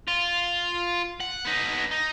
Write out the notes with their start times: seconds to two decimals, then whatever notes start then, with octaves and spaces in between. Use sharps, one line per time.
0.08 F4
1.20 F#5
1.45 B3 D#4
1.91 D#4